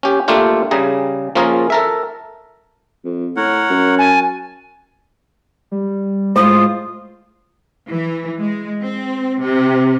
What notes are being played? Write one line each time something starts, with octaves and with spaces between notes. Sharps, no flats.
C#4 G4
A3 A#3 D4 F4 G4
C#3 G3 G#4 A#5
F3 A#3 C#4 F4 G#4 A#4
A4 A#4 E5
F2
A2 A#4 C#5 F#5
F#2
G#5 A5
G3
A2 G#3 F4 C5 D#6
E3
G#3
C4
C3